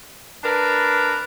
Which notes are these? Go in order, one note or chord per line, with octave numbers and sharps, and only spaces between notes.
D4 A#4 B4